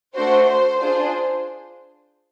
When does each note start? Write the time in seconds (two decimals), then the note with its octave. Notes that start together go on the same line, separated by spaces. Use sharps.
0.15 A3 D4 F#4 C5
0.47 C5
0.80 D4 F4 G#4 C5